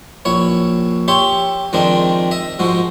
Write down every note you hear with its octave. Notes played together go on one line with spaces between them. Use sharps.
A#1 E4 C#5
G4 C#5 E5 C6
F2 D#3 G#3 C4 D4
D#5 E5
G#2 F3 G#3 F#4